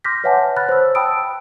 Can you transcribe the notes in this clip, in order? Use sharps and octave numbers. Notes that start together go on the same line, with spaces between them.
C6 D6 F6 G6 A#6 B6
B4 C#5 E5 F#5 G#5 A5
B5 F6 F#6 A6
C5 E6
G5 A5 B5 D#6 E6 D7